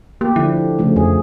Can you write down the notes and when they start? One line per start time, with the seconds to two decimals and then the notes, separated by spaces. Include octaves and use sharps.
0.21 A#3 G4
0.36 D3 F3 D4 E4
0.79 C#3 F3 A3
0.96 F2 G#4